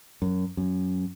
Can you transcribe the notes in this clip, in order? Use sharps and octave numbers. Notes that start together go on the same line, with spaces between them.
F#2
F#2